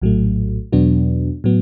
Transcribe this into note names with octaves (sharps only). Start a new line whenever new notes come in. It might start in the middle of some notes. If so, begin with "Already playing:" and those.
A#1 A2 F#3 A3
E2 B2 F#3 B3 D4
A2 F#3 B3